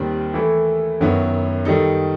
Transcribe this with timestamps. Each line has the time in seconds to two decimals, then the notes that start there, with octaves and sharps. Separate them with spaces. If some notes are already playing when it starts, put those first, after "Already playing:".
Already playing: D#2 D#3 G3 C4
0.34 E3 A3 E4 A4
1.01 F#2 D#3 F#3 B3 E4
1.65 D#3 G3 D#4 A4